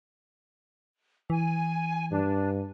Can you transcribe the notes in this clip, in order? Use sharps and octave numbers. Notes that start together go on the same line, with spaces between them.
E3 G#5
G2 D4